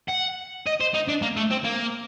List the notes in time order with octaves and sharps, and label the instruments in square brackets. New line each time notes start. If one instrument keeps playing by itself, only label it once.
[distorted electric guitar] F#5
D#5
C5
D#4
D4
A#3
A3
C4
A#3